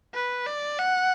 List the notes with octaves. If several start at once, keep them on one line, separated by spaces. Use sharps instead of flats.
B4
D5
F#5